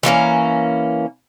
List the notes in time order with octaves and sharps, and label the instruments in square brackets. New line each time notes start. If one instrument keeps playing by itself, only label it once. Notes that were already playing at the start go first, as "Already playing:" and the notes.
[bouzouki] E3 A3 A#3 C#4